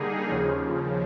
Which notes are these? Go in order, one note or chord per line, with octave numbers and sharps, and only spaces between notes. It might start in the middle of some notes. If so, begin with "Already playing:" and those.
Already playing: D3 G3 A#3 D#4 G#4
D#2 C#3 F3